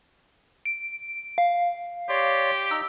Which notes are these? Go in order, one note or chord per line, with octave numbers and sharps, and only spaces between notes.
D7
F5
G4 C#5 D5 C6
D#4 A#5 E6